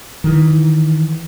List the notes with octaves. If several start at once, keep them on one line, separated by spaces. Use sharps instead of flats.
D#3 E3